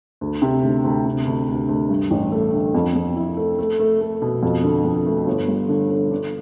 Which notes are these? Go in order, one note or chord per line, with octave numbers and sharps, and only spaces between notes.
D2
C3
D2
D2
C3
D2
D2
D2
G2
A1
A3
D3
F2
F2
E4
A3
A3
A3
A3
B2
F2
D3
F2
A3
G1
G2
D3
D3
D4